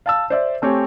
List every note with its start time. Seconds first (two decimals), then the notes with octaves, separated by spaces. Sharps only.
0.06 F5 A5 E6
0.30 C5 D5 E5
0.62 A3 C4 G4 C#5 G#5